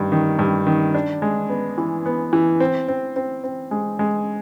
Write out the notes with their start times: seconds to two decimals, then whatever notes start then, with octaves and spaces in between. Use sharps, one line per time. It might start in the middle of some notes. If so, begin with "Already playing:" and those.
Already playing: G2 D#3
0.12 D#3
0.39 G2
0.67 D#3
0.94 D4
1.22 G#3
1.49 B3
1.78 E3
2.06 B3
2.33 E3
2.60 C4
2.88 C4
3.16 C4
3.44 C4
3.71 G#3
3.99 G#3